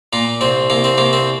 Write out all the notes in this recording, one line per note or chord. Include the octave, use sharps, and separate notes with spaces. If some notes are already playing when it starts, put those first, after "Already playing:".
A#2 A#3
C2 C4
C2 A#3
C4
C2 A#3
C4